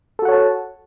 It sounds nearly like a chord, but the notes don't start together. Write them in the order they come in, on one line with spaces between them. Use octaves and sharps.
A4 F#4 F#5 C#5 A5